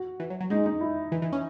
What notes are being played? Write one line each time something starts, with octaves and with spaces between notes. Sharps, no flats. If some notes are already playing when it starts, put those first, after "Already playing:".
Already playing: F#4
E3
F#3
F#3
G#3 D#4
D#4
E4
E3
E3
C#4